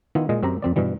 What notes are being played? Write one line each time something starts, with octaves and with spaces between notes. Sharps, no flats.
D#3 B3 E4 F4
A#2 G#3 D#5
F#2 C4 G4 A#5
F2 C4 D5
G2 B2 E3 G3